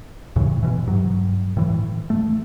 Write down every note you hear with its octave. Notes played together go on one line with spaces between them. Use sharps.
D#2 A2 C#3 E3
B2 E3
G2 F#3
A2 E3
A3